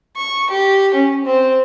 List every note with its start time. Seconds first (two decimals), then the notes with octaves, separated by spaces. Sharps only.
0.17 C#6
0.50 G4
0.94 C#4
1.25 C4